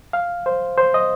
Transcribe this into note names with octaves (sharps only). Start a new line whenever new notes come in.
F5
C5
C5
D#5